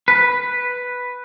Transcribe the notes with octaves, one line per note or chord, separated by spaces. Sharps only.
B4